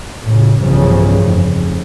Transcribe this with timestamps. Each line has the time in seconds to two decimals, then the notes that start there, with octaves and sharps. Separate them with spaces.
0.23 A2 C#3
0.60 B1 G2 C#3 E3 F3 G3
1.21 F1